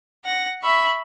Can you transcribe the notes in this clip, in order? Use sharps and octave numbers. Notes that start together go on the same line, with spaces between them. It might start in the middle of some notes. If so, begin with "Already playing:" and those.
F#5 A#6
E5 B5 C#6